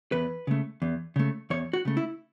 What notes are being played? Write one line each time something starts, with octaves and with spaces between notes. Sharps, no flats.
E2 B4
C#3 A3
E2
C#3 A3
E2 C#5
F#4
C#3 A3
E4